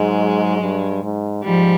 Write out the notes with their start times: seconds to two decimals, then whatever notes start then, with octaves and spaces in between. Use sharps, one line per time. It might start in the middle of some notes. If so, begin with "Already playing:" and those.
Already playing: G#2 F#3 G#3
0.61 G2
1.03 G#2
1.44 G#2 F3 G3